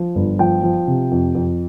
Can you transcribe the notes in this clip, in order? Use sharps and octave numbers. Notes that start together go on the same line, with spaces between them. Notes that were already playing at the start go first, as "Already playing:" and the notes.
Already playing: F3
G1
F3 G5
F3
C3
F2
F2